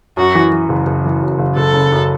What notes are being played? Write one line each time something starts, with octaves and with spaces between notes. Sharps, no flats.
F#2 F#4
E3
E3
F#1
F#1
E3
F#2
F#1
F#1 A4
C#3
F#2